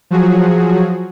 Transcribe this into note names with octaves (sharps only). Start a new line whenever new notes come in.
F3 F#3 F#4 G#4